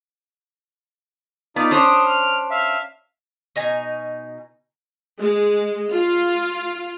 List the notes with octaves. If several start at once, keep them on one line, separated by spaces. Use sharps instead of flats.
B3 D#4 F4 D5
C#4 D4 C5 D#6
F6
E5 F5
B2 D#4 G#5
G#3
F4